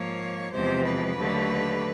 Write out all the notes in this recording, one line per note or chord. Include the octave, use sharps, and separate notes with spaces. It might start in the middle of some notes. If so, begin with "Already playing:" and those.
Already playing: G#2 F3 A#3 C#5
E2 C3 F3 G#3 C5
B4
D#2 D3 F#3 A3